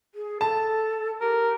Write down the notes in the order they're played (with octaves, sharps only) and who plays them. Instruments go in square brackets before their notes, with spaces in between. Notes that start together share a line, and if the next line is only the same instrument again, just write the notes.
[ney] G#4
[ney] A4 [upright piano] A5
[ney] G4 [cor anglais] A#4